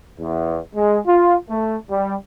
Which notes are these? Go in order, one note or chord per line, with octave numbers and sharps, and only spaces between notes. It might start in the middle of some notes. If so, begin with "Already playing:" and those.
E2
G#3
F4
A3
G3